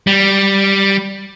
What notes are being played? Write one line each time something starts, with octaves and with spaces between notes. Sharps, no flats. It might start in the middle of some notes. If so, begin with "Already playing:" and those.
G3